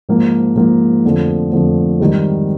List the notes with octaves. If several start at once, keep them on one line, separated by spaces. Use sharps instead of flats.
G#2 F3 A#3
G#2 F3 A#3
F2 D3 F3 A3
F2 D3 F3 A3
G#2 D#3 G3